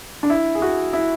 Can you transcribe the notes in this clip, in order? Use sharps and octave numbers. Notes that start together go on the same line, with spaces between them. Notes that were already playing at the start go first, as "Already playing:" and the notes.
D4
E4
G#4
F#4
E4